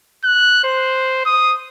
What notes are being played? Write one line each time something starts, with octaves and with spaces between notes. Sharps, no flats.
F#6
C5
D#6